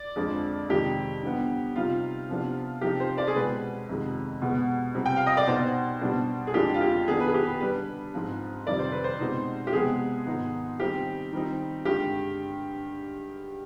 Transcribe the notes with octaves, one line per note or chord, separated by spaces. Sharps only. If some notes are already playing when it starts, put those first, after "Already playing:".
Already playing: D5
F2 D3 F3 G#3
F2 C3 D#3 G#3 G4
D3 G3 B3
C3 G3 C4 D#4 F4
C3 F3 B3 D4
C3 F3 C4 D#4 G4
C5
D5
G#4
B2 G#3 C4 B4
F2 C3 D#3 G#3
B2 G#3 B3
C3 G3 C4
G5
F5
D#5
D5
B2 B3 D#4 C5
B2 G3 B3 D4
G#4
F2 D3 G#3 D4 G4
F4
G4
D#3 B3 D4 G#4
B4
G#4
G4
B4
D3 G3 D4 B4
G#2 F3 C4
F2 C3 D#3 G3 C4 D5
C5
B4
C5
B2 G#3 C4 D#4
G4
C3 F3 G#3 B3 G#4
G#2 D#3 B3 D#4
D#3 G3 C4 D#4 G4
D#3 G3 C4 D#4
G2 D3 G#3 G4